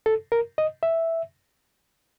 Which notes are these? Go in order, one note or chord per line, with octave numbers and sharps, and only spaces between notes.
A4
A#4
D#5
E5